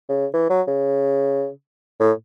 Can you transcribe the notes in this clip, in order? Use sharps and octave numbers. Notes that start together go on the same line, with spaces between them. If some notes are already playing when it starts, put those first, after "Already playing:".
C#3
E3
F#3
C#3
A2